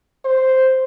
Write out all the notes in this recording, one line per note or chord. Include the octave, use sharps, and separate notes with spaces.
C5